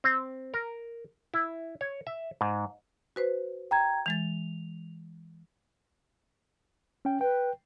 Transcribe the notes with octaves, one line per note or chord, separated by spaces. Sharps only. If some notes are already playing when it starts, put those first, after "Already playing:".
C4
A#4
E4
C#5
E5
G#2
F#4 B4 C5
G5 A#5 G#6
E3 G#3 A6 F7
C#4 G5
B4 G5